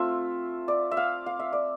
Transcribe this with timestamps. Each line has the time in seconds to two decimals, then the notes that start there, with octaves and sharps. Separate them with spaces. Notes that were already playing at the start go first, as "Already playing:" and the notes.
Already playing: A3 C4 F4 E5
0.68 D5
0.91 E5
0.97 F5
1.26 F5
1.39 E5
1.53 D5